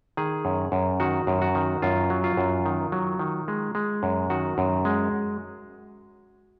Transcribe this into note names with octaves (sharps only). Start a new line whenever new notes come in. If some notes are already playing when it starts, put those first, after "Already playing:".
D#3 G#4
F#2
F#2
D#3 F#4
F#2
F#4
D#3
F#2 F4
F#3
F4
F#2
D#3
F#3
D#3
G#3
G#3
F#2
D#3 F#4
F#2
G#3